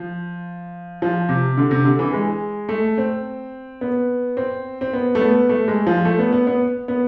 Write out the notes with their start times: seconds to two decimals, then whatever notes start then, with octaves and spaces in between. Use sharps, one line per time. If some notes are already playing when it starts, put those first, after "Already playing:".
Already playing: F3
1.02 F3
1.29 C3
1.57 D3
1.71 C3
1.85 D3
1.99 E3
2.13 G#3
2.69 A3
2.98 C4
3.81 B3
4.37 C4
4.81 C4
4.93 B3
5.15 A3
5.21 B3
5.49 A3
5.68 G#3
5.87 F3
6.05 A3
6.19 B3
6.33 B3
6.47 B3
6.88 B3